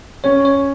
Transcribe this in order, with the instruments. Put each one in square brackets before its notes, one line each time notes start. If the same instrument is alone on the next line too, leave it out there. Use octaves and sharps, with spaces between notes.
[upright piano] C#4 [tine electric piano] C#5
[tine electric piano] C#5